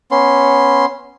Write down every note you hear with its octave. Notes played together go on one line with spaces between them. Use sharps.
B3 C#4 C6